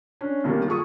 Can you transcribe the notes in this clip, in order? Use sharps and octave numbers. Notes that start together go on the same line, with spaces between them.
C#4 D4
B1 D#3 G3 A#3
F4 G#4 A4 C#6 D#6